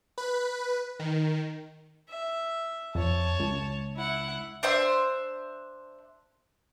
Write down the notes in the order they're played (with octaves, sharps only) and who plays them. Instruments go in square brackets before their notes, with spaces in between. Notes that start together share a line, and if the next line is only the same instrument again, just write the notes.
[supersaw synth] B4
D#3
[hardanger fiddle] E5
[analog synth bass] F2 [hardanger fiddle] C#5 A5
[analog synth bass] C#2
[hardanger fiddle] E4 F#5
[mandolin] D4 C5 E5 C6